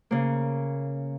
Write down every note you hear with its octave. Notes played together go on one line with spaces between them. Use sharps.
C#3 A#3